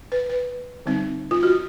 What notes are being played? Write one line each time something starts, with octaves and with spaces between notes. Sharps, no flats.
B4
B4
D3 G3 C4 D#4
F4
F#4